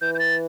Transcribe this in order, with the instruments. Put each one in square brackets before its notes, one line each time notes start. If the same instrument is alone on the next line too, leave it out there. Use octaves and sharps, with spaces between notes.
[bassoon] E3 [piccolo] G6
[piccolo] G6
A6